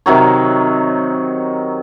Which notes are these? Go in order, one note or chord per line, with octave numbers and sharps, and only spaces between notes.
C3 D#3 F#3 C#5